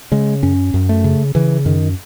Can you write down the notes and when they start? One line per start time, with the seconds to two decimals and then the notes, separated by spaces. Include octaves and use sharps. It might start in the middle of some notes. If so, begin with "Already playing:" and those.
0.12 C#3 G#3
0.43 F#2 C#4
0.74 F#2
0.89 A3
1.04 C#3
1.35 C#3 E3
1.65 F#2 D#3